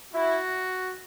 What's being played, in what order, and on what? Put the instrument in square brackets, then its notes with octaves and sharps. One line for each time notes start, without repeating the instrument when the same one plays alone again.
[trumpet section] E4 [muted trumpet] F#4